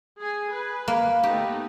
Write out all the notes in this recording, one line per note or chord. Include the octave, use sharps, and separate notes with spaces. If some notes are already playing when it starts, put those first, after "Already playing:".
G#4 G#5
B4
A#3
A3 B3 D#4 G4